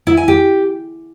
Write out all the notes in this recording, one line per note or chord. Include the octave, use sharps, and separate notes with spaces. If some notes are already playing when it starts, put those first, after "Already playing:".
E4
G#5
G4